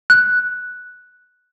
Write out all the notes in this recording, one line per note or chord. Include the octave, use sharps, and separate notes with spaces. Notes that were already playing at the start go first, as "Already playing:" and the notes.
F#6